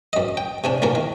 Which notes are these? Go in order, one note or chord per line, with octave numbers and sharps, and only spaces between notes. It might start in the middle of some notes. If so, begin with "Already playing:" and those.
F#2 D#5
G5
C3 C#4 D4
B1 A#2 C#4 A#4
D#3